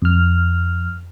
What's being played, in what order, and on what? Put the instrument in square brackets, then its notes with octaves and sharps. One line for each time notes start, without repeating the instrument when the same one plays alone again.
[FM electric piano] F2 F6